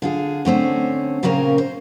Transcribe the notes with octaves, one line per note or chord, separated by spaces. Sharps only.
D3 F4 G#4
D3 A3 C4 C#4
A#2 C#3 A#3 C4 C#4 A#4
C5